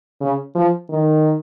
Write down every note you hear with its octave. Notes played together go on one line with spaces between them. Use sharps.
C#3
F3
D#3